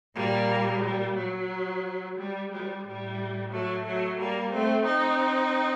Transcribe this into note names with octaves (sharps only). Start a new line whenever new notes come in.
A#2 G3 A#3
G3
F#3
G3
G3
A2 G3
F#3 A3
F#3 A3
G3 A#3
A3 C4
C4 D#4